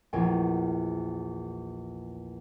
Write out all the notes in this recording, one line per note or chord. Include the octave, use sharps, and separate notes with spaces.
A#1 E2 A3 G5 G#5